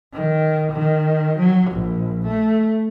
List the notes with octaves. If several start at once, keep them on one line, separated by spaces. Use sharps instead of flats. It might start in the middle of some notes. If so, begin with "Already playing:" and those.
D#3
D#3
F#3
A#1
A3